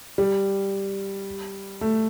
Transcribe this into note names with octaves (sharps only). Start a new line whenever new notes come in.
G3
A3